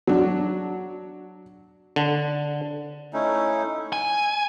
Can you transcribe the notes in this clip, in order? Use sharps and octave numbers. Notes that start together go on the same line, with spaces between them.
F#3 D4
D3
A3 C#4 D#4 E4
G#5